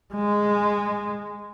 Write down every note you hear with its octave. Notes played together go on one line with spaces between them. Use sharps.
G#3